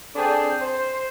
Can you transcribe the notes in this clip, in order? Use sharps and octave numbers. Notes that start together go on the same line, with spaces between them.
C4 D4 G#4 A4 G5
C5